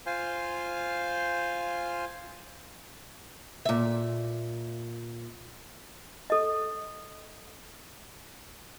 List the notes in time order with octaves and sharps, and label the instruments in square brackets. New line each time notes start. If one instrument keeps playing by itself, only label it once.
[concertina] F4 C5 F5 G#5
[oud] A#2 E5
[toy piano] A4 D#5